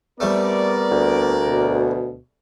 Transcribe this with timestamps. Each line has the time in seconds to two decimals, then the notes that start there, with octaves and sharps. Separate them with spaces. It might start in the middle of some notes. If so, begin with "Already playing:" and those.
0.20 C2 G3 A3 B3 A#4 D5
0.91 D2
1.48 B2